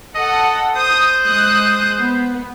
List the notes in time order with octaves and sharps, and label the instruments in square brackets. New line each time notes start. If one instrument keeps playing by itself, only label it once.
[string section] A4 F#5 [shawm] D#5
[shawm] C5 [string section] D#6
[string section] G#3 D#6 F#6
B3